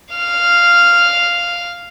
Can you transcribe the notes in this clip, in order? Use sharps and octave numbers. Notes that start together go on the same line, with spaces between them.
F5 F6